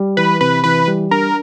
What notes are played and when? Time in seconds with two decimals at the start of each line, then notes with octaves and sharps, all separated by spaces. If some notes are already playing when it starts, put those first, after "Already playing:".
Already playing: G3
0.17 E3 B4
0.41 C3 B4
0.64 E3 B4
0.88 G3
1.11 D4 A#4